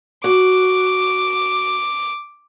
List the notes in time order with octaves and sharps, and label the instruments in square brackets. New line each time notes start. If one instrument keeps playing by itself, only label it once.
[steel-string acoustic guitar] F#4 [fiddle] D6